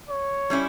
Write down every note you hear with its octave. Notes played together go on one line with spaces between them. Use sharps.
C#5
G3 C#4 E4